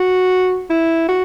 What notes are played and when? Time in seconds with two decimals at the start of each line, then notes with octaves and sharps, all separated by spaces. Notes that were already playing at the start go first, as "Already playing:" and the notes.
Already playing: F#4
0.70 E4
1.09 F#4